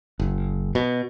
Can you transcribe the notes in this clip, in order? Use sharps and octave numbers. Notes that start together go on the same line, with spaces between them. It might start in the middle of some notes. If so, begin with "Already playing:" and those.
F#1
B2